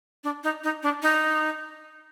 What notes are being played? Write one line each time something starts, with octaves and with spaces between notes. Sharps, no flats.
D4
D#4
D#4
D4
D#4